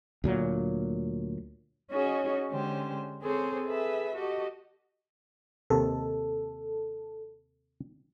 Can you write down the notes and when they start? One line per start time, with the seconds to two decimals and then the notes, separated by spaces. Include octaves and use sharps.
0.24 D2 A#2 F#3
1.91 C#4 D#4 F#4 G#4 C#5 D#5
2.50 D3 G#3 C#4 G4 C5
3.21 C4 G#4 A4 C5 C#5
3.68 G#4 A4 B4 E5
4.15 F#4 G4 A4 D#5
5.70 D#2 C3 D#3 A4